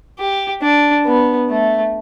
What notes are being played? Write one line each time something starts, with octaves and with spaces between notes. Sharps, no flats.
G4
D4
B3
A3